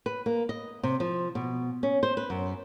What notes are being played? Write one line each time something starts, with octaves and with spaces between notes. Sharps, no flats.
B4
A#3
D#5
C3
F3
B2
C#4
C5
B4
F#2